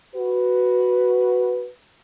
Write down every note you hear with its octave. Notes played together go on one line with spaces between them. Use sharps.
F#4 B4